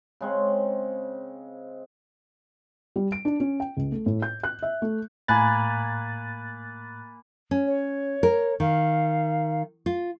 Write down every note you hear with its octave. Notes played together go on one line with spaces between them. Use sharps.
C#3 G#3 C4
G3
D7
D4
C#4
G5
C#2
A3
A2
G6
F#6
E5
A3
A2 A#3 G#5 B5 F#6 A6
C#4
C#5
A#4
D#3 F5
F4